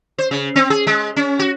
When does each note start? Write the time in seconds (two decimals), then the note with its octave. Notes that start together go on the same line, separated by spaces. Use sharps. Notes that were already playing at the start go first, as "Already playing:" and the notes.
0.18 C5
0.31 C#3
0.56 C4
0.70 G#4
0.87 G#3
1.16 C#4
1.39 F#4